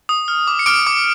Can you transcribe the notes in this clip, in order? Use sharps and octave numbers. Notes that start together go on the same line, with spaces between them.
D#6
F6
D6
C#7
D6 F6 D7
D6